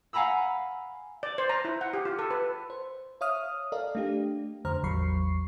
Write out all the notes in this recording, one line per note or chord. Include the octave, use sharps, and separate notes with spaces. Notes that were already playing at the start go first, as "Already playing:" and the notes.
F5 F#5 G#5 A#5 B5 E6
D5
C5
A#5
E4
F#5
G4
F4
A4
B4
C5
C#5 E5 F5 D#6 F6
A4 A#4 D5 D#5 F5
A3 D4 G4
F2 D3 C5 A#5 F6
A1 E2 F#3 B5 C#6 C7